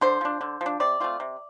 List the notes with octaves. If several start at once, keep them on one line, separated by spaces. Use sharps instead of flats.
D3 C5
F3 D4
D3
F3
D4
C3 D5
A3 C4 F4
C3